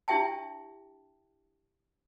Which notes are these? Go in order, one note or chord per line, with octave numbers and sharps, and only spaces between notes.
D4 E4 G4 E5 G5 A5